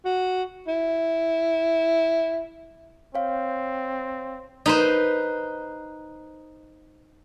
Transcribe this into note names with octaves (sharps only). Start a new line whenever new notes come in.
F#4
E4
C4 C#5 F5
D#4 B4 C5